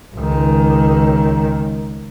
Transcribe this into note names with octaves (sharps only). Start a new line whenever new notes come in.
C#2 D#3